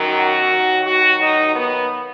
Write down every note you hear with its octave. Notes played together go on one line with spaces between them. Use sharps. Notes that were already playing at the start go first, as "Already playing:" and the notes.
Already playing: F#2 D#3 F#3
F#4
D#2 D#3 F#3
F#4
D#4
B3